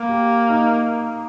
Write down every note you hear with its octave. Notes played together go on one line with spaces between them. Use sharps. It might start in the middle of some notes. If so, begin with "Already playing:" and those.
Already playing: A#3
G4
D#4